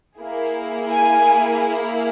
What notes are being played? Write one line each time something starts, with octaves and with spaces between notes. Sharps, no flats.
A#3 E4 G#4
G#5